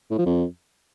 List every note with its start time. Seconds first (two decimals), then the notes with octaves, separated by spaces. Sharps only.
0.10 A2
0.18 F3
0.25 F2